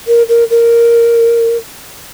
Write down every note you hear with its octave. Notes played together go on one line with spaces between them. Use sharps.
A#4
A#4
A#4